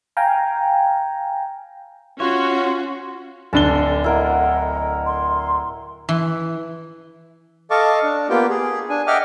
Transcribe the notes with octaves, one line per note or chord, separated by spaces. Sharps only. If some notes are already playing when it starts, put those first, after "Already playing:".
F5 G5 G#5 A#5
C#4 F4 F#4 C#5 C6
D1 D3 A5 G7
E4 A#4 D#5 F#5
C6
E3
A4 D#5 F5 A5 C#6 D6
D4
A#3 B3 F4 G4 G5
G#4
D4 G#5
D#5 E5 F#5 G5 D6 F6